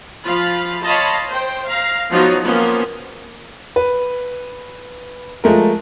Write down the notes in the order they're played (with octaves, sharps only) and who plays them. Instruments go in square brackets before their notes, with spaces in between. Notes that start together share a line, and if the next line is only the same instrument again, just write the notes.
[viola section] F3 F4 F5 B5
C#5 D#5 F5 A5 B5 C6
C5 G5
F5 A#5
F3 F#3 B3 D#4 F4 F#4
F3 A#3 B3 C#4
[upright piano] B4
F3 G#3 A3 A#4